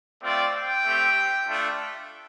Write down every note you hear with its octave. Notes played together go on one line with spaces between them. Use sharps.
A3 C4 F4 D5
G5
A3 C4 G4
A3 D4 F4